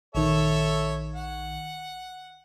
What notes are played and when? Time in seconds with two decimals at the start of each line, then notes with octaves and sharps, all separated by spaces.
0.15 A#1 D#3 A4 C#5 E5
1.14 F#5